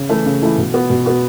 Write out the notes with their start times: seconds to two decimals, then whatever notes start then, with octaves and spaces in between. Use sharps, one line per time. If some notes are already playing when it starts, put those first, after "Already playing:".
Already playing: C#3
0.09 E3 A3 E4
0.26 C#3
0.42 E3 A3 E4
0.57 B2
0.74 B3 F#4
0.90 B2
1.06 B3 F#4